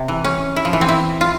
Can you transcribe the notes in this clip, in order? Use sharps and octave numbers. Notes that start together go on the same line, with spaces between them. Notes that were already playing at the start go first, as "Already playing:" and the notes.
Already playing: C3
E3
C#4
E4
F3
E3
C4
E4
F4